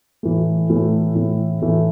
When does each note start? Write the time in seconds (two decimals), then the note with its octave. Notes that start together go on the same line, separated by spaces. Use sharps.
0.23 A2 E3 A3
0.70 A2 E3 A3
1.15 A2 E3 A3
1.61 A2 E3 A3